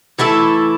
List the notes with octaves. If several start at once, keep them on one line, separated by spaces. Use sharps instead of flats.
E3 A3 E4 A4